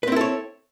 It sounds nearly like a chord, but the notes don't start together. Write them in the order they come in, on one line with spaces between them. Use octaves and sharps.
B4 C4 E4 A4 C#5